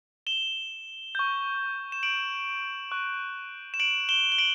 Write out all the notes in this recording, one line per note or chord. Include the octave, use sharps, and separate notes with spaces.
E7 G7
C#6 G6
E7
D7 F#7
C#6 F#6
E7
D7 F#7
E7 G7
G7
D7 F#7